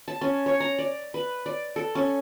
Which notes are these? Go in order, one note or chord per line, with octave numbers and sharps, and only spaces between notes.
A5
C#4
C#5
A#5
D5
B4
D5
A4
C#4